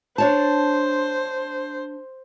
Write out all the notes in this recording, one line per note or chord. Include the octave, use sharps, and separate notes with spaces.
D4 C5 C#5 A5